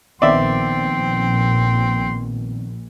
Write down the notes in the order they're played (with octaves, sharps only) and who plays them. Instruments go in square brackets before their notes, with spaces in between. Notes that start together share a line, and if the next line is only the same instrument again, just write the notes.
[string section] A#1 [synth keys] D#3 B3 C4 [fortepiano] D5 E5 [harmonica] G5 C6